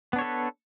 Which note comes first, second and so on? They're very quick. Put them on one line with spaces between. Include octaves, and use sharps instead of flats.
B3 D4 C#5 A4 B4